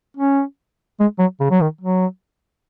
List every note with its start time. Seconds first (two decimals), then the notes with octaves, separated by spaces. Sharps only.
0.17 C#4
1.00 G#3
1.19 F#3
1.40 C#3
1.50 F#3
1.61 D#3
1.81 F#3